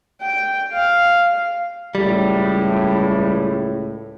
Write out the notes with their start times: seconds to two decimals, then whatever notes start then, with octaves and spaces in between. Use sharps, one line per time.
0.22 G5
0.73 F5
1.95 C#2 A2 G3